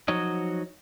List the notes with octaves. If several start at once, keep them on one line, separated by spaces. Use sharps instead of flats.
F3 F#3 D#4 F#4 C#5 D#5